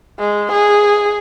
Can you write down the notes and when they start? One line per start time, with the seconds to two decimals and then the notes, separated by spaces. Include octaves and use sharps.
0.19 G#3
0.52 G#4